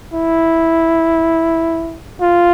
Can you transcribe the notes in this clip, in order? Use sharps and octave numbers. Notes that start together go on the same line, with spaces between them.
E4
F4